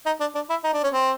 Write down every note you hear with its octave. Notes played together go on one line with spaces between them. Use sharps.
D#4
D4
D4
E4
D#4
D4
C#4
C4